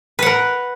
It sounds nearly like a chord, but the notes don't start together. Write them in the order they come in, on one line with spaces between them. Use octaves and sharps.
B4 F#5 A#4